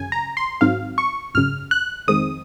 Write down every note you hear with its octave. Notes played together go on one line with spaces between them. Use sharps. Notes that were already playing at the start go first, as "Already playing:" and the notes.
Already playing: G#1 F#2 C#3 G#5
A#5
C6
G#1 G#2 D#3 F#3 C4 F5
C#6
G#1 F#2 C#3 F6
F#6
F2 D#3 G#3 C4 D#6